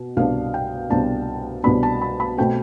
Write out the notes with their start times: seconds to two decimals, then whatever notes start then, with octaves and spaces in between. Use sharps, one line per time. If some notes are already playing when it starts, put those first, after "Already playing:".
Already playing: B2
0.17 C2 B2 B3 D4 F5
0.54 G5
0.90 C2 B2 B3 D4 A5
1.64 C2 B2 B3 D4 B5
1.83 A5
2.02 B5
2.20 B5
2.37 B2 A3 C4 G5